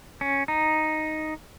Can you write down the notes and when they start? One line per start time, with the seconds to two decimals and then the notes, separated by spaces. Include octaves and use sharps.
0.21 C#4
0.48 D#4